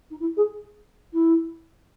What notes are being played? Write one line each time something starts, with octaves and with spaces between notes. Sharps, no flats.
D#4
E4
G#4
E4